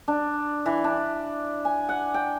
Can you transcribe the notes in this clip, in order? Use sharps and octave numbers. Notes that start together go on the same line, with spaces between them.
D4
E3
D4
G#5
F#5
G5